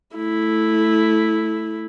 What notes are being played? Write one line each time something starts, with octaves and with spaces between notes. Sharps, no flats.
A3 E4